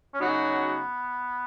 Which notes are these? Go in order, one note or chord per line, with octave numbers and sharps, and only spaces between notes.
C#4
C#3 F#3 B3 D#4 F#4